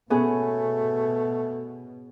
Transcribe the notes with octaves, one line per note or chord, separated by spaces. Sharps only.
B2 A3 B3 C#4 G#4